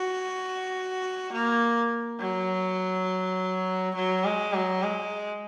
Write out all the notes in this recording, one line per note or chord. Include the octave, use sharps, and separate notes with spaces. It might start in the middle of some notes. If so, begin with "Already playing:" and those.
Already playing: F#4
A#3
F#3
F#3
G#3
F#3
G#3